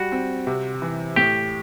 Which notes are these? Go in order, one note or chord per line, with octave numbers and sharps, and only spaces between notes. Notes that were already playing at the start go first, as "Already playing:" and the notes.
Already playing: G3 F#4
C4
C3
E3
A2 G4